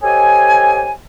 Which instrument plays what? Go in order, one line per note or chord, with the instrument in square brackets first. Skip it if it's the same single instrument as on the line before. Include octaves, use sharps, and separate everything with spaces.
[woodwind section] G4 A4 C5 C#5 D#5 G#5